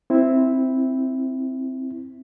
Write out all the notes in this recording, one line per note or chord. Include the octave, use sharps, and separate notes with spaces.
C4 E4